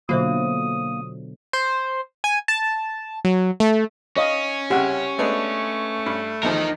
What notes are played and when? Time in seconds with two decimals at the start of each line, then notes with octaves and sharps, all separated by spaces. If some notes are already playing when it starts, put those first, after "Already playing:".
0.09 B2 D3 F#3 A#3 F4 C5 E5 D#6
1.53 C5
2.24 G#5
2.48 A5
3.25 F#3
3.60 A3
4.17 C#4 C#5 D#5 F5
4.70 C2 C#3 G4 F#5
5.19 G#3 A3 B3 D4
6.06 G2
6.43 E2 D#3 F3 D#4 A#4